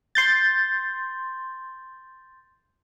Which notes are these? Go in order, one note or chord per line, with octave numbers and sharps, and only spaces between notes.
C6 G6 A6